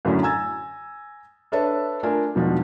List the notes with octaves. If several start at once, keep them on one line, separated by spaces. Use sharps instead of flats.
F#2 A2 D3 F#3 A3 C#4
G#5 A#5 E6 G#6 A6
D4 A4 B4 C#5 E5 A5
A3 D4 F4 A#4 G#5
E1 B2 D#3 F3 D4 F#4